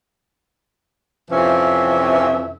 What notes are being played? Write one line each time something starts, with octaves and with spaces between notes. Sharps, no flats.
F2 C3 E3 F3 C#4 E5